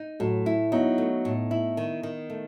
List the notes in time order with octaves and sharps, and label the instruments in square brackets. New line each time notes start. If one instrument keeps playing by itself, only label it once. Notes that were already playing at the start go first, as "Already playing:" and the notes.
Already playing: [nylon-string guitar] D#4
[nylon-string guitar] A2 [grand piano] F#3 A3
[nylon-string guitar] E4
[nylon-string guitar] F#3 [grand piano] B3 D#4
[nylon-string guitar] A3
A2
E4
D#3
D#3
A3